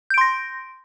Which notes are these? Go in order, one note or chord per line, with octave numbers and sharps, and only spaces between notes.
C6 G6 A#6 D7